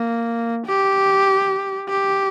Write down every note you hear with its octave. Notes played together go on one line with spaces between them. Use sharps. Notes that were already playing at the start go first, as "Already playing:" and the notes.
Already playing: A#3
G4
G4